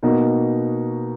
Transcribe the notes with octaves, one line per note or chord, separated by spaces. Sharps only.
B2 A#3 D#4 F#4